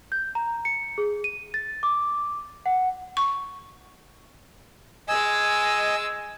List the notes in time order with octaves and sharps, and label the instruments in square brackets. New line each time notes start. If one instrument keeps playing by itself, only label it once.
[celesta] G6
A#5
C#7
G#4
D#7
A6
D6
F#5
[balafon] C#6
[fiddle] G#3 E6 [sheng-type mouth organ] D#5 G#5